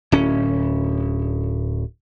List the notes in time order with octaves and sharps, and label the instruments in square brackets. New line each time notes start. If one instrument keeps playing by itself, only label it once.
[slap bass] D1 C#4